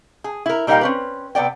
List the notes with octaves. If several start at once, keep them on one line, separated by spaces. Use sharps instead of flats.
G#4
E4 A#4
A#2 G3 D#4 A#4 F5 G5
C4 C#4 B4
C3 B3 D5 G5